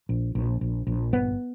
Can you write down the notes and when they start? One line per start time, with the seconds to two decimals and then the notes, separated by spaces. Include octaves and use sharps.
0.09 A#1
0.35 A#1
0.61 A#1
0.87 A#1
1.13 G1 B3